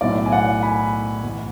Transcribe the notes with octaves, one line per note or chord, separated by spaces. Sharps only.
B1 A2 D5
G#5
D5 F#5
G#5 B5
A1